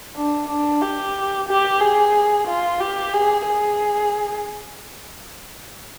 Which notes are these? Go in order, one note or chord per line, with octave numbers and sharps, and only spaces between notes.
D4
D4
G4
G4
G#4
F4
G4
G#4
G#4